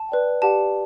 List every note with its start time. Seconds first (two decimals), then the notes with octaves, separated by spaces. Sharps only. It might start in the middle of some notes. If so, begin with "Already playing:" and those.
Already playing: A5
0.09 B4 D5 G5
0.42 G4 D5 F#5 A5